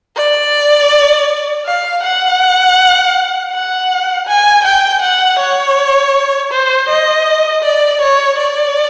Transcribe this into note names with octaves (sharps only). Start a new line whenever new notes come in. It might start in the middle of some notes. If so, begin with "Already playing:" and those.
D5
F5
F#5
F#5
G#5
G5
F#5
C#5
C5
D#5
D5
C#5
D5